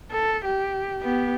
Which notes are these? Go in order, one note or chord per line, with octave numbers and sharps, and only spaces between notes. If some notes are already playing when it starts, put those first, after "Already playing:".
A4
G4
B3 G4